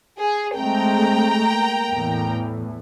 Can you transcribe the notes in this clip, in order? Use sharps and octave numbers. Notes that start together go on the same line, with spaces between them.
G#4
G#3 A3 C4 G5 A#5
A#3
E2 A2 E3